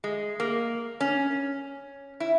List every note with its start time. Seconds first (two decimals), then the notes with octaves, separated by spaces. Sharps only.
0.04 G#3
0.40 A#3
1.01 C#4
2.20 E4